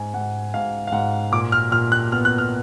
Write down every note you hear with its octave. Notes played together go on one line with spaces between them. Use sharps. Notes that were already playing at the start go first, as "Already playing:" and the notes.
Already playing: G#2 G#5
G#2 F#5
G#2 F5
F5
G#2 F#5
A#2 D6
F6
A#2 F6
F#6
B3 F6
F#6
F6